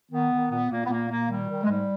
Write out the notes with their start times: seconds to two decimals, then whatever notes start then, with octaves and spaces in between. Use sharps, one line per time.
0.11 D#3 B3
0.30 D#3
0.50 A#2 B3
0.70 A#2 A#3
0.85 B3
0.89 A#2 A#3
1.09 A#2 A#3
1.29 D#3 G3
1.49 D#3
1.64 G#3
1.68 G#2 G3